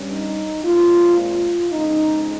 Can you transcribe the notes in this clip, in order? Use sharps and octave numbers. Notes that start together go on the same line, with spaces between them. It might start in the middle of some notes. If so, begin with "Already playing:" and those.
Already playing: G2 G3 C#4
D#4
A#2 G#3 C4 F4
F4
F2 C#3 G#3 D#4